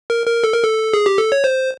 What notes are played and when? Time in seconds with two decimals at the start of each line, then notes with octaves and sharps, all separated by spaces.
0.10 A#4
0.26 A#4
0.44 A4
0.54 A#4
0.63 A4
0.94 G#4
1.06 G4
1.18 A4
1.32 C#5
1.44 C5